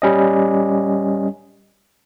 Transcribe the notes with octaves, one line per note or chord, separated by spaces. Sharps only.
G3 C#4 D#5